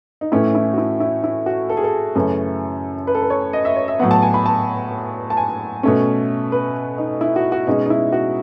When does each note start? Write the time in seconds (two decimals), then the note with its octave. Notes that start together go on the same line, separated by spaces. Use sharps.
0.21 D#4
0.32 A2 E3 A3 C#4 E4
0.55 E4
0.73 F#4
0.78 E4
1.00 E4
1.24 E4
1.46 F#4
1.69 A4
1.77 G#4
1.84 A4
2.15 F#2 C#3 E3 A3 C#4
3.07 B4
3.15 A4
3.22 B4
3.30 C#5
3.53 D#5
3.65 E5
3.76 C#5
3.88 E5
3.99 A2 F#3 B3 F#5
4.11 A5
4.22 G#5
4.34 B5
4.46 A5
5.30 A5
5.37 G#5
5.83 B2 A3 C#4
6.52 B4
6.98 D#4
7.21 E4
7.36 F#4
7.52 F#4
7.67 B2 G#3 C#4 D#4
7.86 D#4
7.90 E4
8.12 F#4